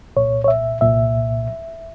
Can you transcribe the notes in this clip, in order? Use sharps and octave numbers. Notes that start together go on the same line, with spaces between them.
C2 A#2 C#5
C#5
E5
C2 A#2 E5